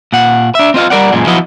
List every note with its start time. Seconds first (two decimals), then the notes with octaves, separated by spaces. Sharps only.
0.12 A#2 F#5
0.55 D4 E5
0.74 C4 F4 D#5 F5
0.90 G3 A#4 D5 F#5
1.12 F#2 A#2 G#3
1.27 F3 F#3 B3 E4 F#4 D#5